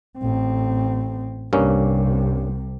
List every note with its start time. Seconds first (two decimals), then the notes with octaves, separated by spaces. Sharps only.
0.19 A1 C4
1.53 C2 G2 C3 A#3 C#4